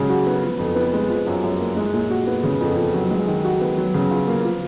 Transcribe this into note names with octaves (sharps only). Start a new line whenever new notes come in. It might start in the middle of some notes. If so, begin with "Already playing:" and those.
Already playing: C#3 F#3 G#3
F#4
B3
F3
F2
B3
G#3
F3
F#2
F#2
A#3
G#3
A#2
F#4
B3
C#3
F2
F2
F#3
G#3
D#3
F#4
B3
F#3
C#3
F4
A#3
F3